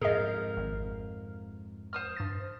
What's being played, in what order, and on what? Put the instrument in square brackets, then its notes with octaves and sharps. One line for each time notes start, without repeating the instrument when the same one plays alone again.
[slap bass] F2 G#2 [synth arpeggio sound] G#4 D#5 [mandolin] A#4 F5
[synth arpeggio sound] G#1
[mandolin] C5 D#6 F6
[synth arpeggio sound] G2 A6